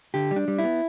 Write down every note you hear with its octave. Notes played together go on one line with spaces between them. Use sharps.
D3 G4
G3
D4
G3
E4
B3